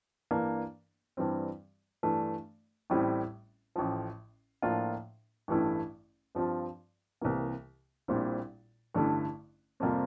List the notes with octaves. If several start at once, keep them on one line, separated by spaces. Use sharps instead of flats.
G2 E3 A#3 D4
G2 E3 G3 C4
G2 E3 A3 D4
A1 A2 G3 C4 E4
A1 A2 F3
A2 F3 A#3 D4 F4
A1 G2 E3 A3 E4
G2 F3 C4 F4
C2 C3 E3 A#3
A#1 A#2 G3 C4 E4
A1 G2 D3 A3 E4
F2 C3 G3 A#3 F4